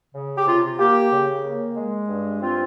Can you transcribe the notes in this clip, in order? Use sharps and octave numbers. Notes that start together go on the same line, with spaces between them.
C#3
G4
C3 F4
A#3 G4
C#3
A#3
G#3
G2
C4 F4